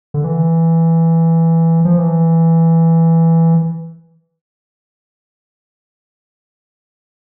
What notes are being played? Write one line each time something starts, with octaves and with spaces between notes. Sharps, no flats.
D3
E3
F3
E3